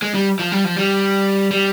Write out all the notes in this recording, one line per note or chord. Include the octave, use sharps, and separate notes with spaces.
G#3
G3
F3
G3
F3
G3
G3